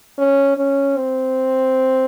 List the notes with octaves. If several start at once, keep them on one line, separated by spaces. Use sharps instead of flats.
C#4
C#4
C4